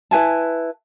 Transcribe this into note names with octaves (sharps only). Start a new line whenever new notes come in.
E4 B4 G#5 A5